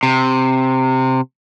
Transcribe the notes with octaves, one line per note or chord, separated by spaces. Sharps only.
C3